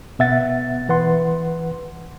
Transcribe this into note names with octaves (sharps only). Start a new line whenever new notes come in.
B2 B3 E5 F#5 A6
E3 B4 F#5 C6